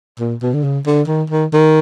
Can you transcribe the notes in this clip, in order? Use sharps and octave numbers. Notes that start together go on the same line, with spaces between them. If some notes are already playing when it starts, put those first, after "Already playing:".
A#2
B2
D3
C#3
D3
D#3
D#3
D#3